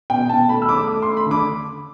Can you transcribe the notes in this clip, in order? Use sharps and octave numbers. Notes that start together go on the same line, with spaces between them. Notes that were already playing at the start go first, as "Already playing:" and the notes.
B2 G5
B2 A5
A3 B5
E6
A3 D6
A3 D6
A3 C6
B5
D3
D6